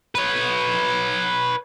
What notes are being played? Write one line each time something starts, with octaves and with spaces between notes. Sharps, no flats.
B4 C#5